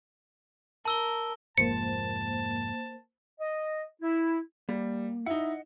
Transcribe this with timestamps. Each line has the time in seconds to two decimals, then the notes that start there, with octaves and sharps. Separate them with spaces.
0.85 A#4 A5 E6 G7
1.58 F1 G#2 F3 A#3 C5 A5 C#7
3.39 D#5
4.01 E4
4.69 G3 A#3
5.26 D#4 E4 D#5 F#5